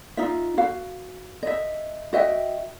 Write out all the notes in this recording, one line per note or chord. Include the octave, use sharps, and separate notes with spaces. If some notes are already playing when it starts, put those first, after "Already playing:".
D#4 F4 E5
F#4 F5
D#5 E5
F#4 D#5 E5 G5